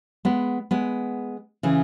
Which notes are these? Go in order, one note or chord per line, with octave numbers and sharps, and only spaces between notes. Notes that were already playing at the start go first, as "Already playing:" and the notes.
G#3 B3
G#3 B3
C#3 E3